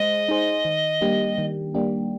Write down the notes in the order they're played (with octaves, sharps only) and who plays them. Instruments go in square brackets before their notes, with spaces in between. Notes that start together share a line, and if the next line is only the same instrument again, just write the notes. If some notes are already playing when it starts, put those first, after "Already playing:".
Already playing: [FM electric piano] G#3 G#4 C5 [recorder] D#5
[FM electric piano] D#4 G#4 C5
D#3
G3 A#3 D4 G4
D#3
G3 A#3 D4 G4